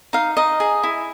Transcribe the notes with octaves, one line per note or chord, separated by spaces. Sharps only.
D#4 F5
D#4 D#5
G#4
E4